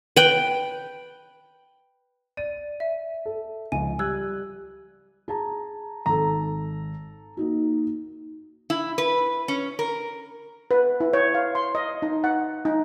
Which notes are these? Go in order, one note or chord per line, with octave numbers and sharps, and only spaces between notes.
B4 G5
D5 D#7
E5
A4
C#2 F3 G#5
G3 E6 F#6 G#6
G#4 A5 A#5
G#1 A4 A#5
A#3 D#4 F#4
E4
B4
C#4
A#4
B4
E4
C#5
F5
C6
D#5
D#4
F#5
D#4